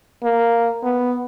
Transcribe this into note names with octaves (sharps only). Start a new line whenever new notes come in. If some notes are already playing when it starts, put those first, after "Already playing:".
A#3
B3